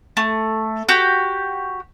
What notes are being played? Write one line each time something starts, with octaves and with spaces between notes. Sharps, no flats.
A3
F#4 G4